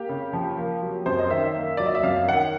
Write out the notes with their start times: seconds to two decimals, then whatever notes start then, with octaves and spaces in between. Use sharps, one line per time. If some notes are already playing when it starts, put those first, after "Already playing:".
Already playing: A#3 G4
0.09 C#3
0.33 F3
0.57 A#3
0.82 F#3
1.06 F#2 C5
1.19 D#5
1.30 D#3 E5
1.55 A#3
1.77 F#3 D5
1.86 D#5
1.95 E5
2.03 F#2 F5
2.28 D#3 F#5